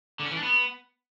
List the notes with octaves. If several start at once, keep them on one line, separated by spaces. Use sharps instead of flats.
D3
C#4
E3
D4
B3